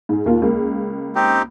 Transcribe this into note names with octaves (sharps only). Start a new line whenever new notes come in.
G#2 G#4
D#2 A#3 F4
C#2 A#3
C4 D#4 G4